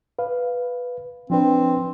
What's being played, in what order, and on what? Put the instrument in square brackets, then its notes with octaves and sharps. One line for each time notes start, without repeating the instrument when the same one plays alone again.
[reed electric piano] B4 F5
[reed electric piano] F3 D4 B4 [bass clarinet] C4